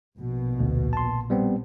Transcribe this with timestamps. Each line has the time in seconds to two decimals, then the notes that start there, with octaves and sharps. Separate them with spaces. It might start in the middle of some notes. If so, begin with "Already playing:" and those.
0.16 A#1 B2
0.59 D2
0.93 A5 C6
1.30 G3 B3 C4